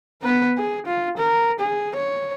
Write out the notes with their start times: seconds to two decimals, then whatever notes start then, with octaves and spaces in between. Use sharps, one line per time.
0.22 B3 B4
0.58 G#4
0.86 F4
1.18 A#4
1.60 G#4
1.95 C#5